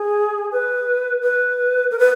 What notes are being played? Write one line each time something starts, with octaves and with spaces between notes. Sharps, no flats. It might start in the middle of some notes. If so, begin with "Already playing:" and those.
Already playing: G#4
B4
B4
A#4
B4